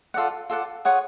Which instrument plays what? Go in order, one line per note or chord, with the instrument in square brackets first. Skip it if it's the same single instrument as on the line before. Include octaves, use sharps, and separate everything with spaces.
[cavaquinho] F4 A4 D5 F#5
F4 A4 D5 F#5
F4 G#4 C#5 F#5